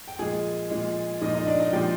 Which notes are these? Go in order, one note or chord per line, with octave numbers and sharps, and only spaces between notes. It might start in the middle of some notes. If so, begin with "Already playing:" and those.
G5
A#2 F3 G#3 G#4 G#5
A#2 F3 G#3
A#2 F3 G#3 D#4 D#5
D#4 D#5
D4 D5
D#4 D#5
A#2 F3 G#3 G4 G5